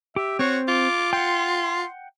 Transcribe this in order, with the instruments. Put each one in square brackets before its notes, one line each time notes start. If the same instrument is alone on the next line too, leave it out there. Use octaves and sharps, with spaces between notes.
[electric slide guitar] G4 [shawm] E5
[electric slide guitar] C4 C5 [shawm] F#4 [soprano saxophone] C#5
[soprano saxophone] F4 [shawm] D6
[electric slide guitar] F#5 G5 [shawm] C6